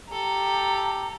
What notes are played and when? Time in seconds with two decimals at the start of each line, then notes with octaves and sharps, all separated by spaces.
0.12 G4 A4 A#5